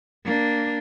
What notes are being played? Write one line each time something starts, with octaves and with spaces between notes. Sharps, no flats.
A#3 D4